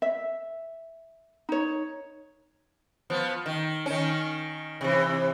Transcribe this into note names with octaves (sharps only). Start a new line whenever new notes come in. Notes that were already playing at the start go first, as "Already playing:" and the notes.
E5
D#4 C#5
F3 B3
D#3
D#3 C#4
C3 E3